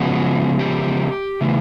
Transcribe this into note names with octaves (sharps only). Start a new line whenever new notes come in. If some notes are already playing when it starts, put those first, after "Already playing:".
Already playing: C#3 F3 G#3 B3 F#4
G4
C#3 E3 A3